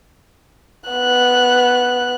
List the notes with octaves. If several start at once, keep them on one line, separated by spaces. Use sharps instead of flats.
B3 F#6